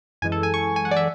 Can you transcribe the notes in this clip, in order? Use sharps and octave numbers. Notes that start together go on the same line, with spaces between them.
F#2 E3 G#3 G#5
A4
G#5
C#6
G#5
F#5
D5
E5